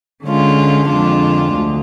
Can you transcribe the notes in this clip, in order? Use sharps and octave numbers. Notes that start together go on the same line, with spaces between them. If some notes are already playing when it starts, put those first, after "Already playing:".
D3 G#3 C#4 F4
F2 D3 G#3 D4 F4
D2